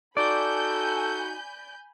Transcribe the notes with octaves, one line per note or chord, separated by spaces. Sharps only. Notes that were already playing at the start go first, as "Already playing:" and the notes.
D#4 F#4 A4 D5 G#5 B5 G6